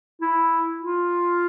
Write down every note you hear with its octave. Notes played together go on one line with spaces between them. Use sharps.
E4
F4